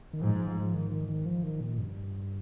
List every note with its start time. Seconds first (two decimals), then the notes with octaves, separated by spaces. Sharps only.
0.13 D#3
0.21 G#2 F3
0.35 F3
0.48 F3
0.61 F3
0.74 D#3
0.91 D#3
1.08 D#3
1.26 F3
1.43 D#3
1.61 A#2
1.78 G2